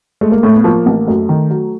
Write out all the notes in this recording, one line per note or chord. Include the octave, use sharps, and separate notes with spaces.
G#3 A3
A#3
A2 A3
B3
F3 A#3
A1
F#2 A3
D#3
F#3